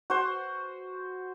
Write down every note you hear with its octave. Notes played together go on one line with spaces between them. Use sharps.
F#4 C5